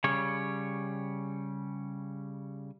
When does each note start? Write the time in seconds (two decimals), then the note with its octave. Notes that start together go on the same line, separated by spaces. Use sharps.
0.04 C#3 G3 C#5